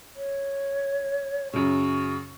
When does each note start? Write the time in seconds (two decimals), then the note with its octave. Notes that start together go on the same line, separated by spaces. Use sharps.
0.16 C#5
1.53 F#2 C#3 C#6